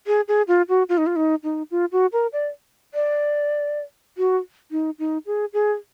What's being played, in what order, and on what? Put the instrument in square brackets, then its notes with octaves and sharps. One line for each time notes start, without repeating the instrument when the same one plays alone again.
[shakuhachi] G#4
G#4
F4
F#4
F4
D#4
F4
D#4
D#4
F4
F#4
A#4
D5
D5
F#4
D#4
D#4
G#4
G#4